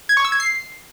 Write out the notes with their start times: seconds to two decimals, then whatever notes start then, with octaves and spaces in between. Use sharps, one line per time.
0.09 G#6
0.17 C#6
0.25 E6
0.32 G#6
0.40 C7